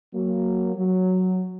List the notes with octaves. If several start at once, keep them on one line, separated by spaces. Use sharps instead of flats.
F#3 A#3
F#3